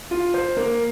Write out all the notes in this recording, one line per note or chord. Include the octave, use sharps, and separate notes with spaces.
F4
C5
A#3